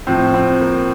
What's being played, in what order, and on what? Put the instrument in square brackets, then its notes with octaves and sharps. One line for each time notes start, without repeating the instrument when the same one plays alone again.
[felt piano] A2 F3 C4
C4
A#3